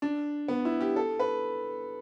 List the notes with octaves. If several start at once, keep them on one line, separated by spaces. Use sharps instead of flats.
D4
B3
E4
G4
A4
B4